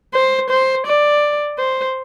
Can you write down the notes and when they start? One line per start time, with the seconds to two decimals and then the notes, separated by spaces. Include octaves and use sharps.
0.14 C5
0.50 C5
0.86 D5
1.58 C5